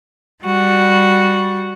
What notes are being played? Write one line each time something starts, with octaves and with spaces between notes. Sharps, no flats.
G3 F#4